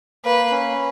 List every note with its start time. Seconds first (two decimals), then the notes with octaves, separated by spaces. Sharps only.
0.24 A#3 B4
0.51 C#4